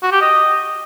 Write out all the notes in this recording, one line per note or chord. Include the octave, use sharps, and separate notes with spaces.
F#4
G4
D#5